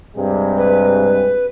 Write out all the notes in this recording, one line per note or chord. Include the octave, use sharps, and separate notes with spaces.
G2 C3 G#3
B4